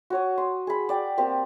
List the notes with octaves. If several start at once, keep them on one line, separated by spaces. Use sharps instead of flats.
F#4 C#5 D#6
C6
G#4 B5
D5 G5
A#3 C4 G4